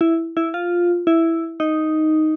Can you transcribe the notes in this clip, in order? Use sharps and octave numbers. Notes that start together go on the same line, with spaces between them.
E4
E4
F4
E4
D#4